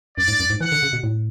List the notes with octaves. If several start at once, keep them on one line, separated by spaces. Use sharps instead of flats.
F#2 D5
G#2
F#2
G#2
E3 F#5
D3
C#3
B2
A2